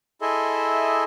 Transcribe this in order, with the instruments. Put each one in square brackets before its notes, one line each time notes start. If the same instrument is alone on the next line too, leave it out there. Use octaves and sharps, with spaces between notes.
[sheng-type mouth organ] E4 G#4 A4 D#5 E5 C6